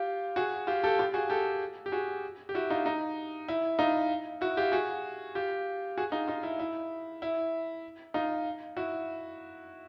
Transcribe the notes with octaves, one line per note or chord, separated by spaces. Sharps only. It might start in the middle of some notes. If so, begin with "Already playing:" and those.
Already playing: F4 G4
F#4 G#4
F4 G4
G4 A4
F4 G4
F#4 G#4
G4 A4
G4
F#4 G#4
G4
E4 F#4
D#4 F4
D#4
E4
D#4 F4
E4 F#4
F4 G4
F#4 G#4
F4 G4
F#4 G#4
D#4 F4
D#4 F4
E4
E4
E4
D#4 F4
E4 F#4